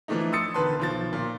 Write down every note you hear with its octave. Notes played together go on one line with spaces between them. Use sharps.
E3 F3 A3 D4 D#4
C6 D#6 E6 A6 C#7
E1 D3 D#3 B4 A5 C6
B1 F3 A6
A#2